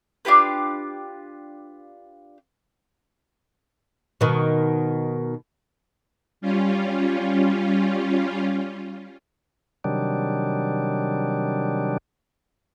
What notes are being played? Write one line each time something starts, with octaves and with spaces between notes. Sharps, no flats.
D4 F4 G4 B4
B2 D#3
G3 C#4 F4
C3 D#3 F#3 G3 D4